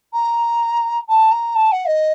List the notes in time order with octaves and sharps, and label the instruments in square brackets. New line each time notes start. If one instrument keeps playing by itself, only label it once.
[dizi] A#5
A5
A#5
A5
F#5
D#5